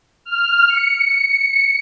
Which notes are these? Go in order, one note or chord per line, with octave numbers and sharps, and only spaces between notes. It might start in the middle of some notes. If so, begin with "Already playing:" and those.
F6
C#7